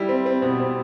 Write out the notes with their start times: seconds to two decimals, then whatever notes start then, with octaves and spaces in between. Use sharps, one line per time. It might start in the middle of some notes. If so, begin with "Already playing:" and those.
Already playing: G3 E4
0.09 C4
0.26 C4
0.42 B2
0.60 C4